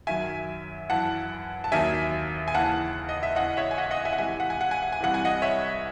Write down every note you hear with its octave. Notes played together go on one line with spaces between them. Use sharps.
F#2 D#3 F#3 E5 G#5
F#2 E3 F#5 A5
A5
D#2 D#3 F#3 E5 G#5
G#5
D#2 C#3 E3 F#5 A5
D#5
E5
E2 C#3 E3 D#5 F#5
C#5 E5
G#5
D#5 F#5
D#5 F#5
E5 G#5
F#5
C#2 C3 E3 E5 G#5
F#5
G#5
F#5
G#5
F#5
G#5
C2 C3 E3 F#5
G#5
D#5 F#5
C#5 E5